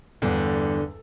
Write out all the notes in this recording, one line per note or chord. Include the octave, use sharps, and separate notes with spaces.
E2 G2 D3